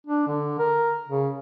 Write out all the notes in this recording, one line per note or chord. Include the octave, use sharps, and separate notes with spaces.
D4
D3
A#4
C#3